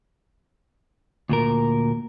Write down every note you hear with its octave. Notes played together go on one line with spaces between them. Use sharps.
D2 A#2 A#4